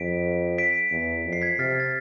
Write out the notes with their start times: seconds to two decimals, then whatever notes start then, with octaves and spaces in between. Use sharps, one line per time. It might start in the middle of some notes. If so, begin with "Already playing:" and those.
Already playing: F2 B6 D7
0.58 B6 D7
0.91 E2
1.25 F2
1.33 C7
1.42 G#6 B6
1.58 C3 F6 A6
1.80 A6